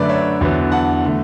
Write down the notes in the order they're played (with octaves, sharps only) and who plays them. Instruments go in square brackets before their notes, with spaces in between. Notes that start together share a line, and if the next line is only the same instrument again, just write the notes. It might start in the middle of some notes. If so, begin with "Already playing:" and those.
Already playing: [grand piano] F#2 D3 A3 B4 D5
C#5 E5
E2 D3 F#3 B3
F#5 A5
D3 A3